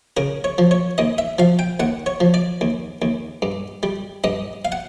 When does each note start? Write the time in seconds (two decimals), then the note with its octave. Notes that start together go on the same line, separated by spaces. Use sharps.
0.17 C#3 A#4
0.44 C#5
0.58 F3
0.71 C#5
0.98 D#2 D#5
1.18 E5
1.39 F3 F5
1.59 G5
1.80 D#2 F#5
2.06 C#5
2.20 F3
2.34 D5
2.61 D#2
3.02 D#2
3.42 G2
3.83 G3
4.24 G2 D#5
4.65 F5
4.72 F#5